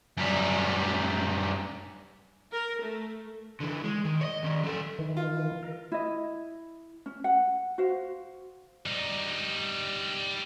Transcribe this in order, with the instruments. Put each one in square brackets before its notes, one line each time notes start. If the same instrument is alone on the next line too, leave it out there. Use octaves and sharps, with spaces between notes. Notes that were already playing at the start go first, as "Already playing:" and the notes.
[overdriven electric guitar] F#2 G3
[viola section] A#4
A3
[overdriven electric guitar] D3 E3
G#3
D#3
C#5 D#5
D#3 C#4
F#3 A4
[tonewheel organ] D#3 E3
[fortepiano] F4
[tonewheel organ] A#4
[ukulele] E4 D#5
C#4
F#5
F#4 C5 F5
[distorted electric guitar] G3 D#4